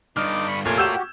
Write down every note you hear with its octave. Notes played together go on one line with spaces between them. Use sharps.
G2 D3 D#4 D6 F6
B5 C#6
F1 A#2 A3 F4 A#4 C#5 G#6
F#4 G4 E6 G6 E7